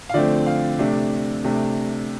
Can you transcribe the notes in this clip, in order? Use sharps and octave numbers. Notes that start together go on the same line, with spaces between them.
F5
D3 F3 A3 C4 D5
F5
C3 A3 D4
C3 A3 D4